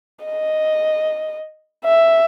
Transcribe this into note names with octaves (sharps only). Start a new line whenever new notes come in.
D#5
E5